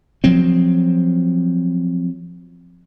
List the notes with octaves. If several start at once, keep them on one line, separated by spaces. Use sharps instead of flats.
F3 F#3 C4